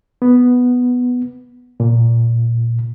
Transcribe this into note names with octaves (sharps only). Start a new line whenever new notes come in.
B3
A#2